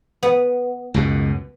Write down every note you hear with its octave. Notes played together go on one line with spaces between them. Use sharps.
B3
C#2 F#2 B2